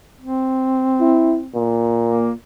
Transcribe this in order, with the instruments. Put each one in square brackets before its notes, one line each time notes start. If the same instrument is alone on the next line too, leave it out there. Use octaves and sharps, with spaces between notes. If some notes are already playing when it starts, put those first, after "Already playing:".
[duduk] C4
[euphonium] E4
A#2
[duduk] A#3